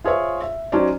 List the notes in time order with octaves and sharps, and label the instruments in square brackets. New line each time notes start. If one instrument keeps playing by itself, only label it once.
[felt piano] F4 G#4 C5 C#5 E5
E5
F#3 C#4 D#4 C5 D5